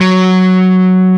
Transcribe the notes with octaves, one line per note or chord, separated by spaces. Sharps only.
F#3